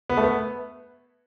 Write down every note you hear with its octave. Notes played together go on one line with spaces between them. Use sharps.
B3
A3
B3